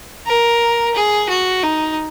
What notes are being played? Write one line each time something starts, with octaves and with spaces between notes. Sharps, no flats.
A#4
G#4
F#4
D#4